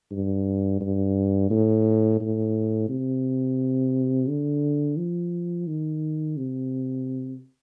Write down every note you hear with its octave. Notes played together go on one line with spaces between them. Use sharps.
G2
G2
A2
A2
C3
D3
F3
D#3
C3